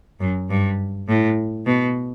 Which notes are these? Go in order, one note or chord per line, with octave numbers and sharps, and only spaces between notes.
F#2
G2
A2
B2